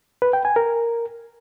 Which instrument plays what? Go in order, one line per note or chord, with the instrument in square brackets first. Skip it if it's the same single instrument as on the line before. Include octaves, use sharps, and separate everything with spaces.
[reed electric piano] B4
G5
G#5
A#4